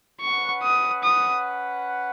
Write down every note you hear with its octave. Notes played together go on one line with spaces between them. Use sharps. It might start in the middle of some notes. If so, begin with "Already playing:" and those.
C#4 B4 F#5 C#6
D#6
D#6